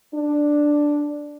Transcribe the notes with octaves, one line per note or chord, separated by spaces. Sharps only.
D4